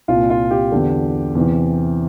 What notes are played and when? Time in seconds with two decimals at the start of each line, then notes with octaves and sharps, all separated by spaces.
0.08 C2 A#2 F4
0.30 F4
0.51 G4
0.72 E2 D3
1.35 E2 C3 E3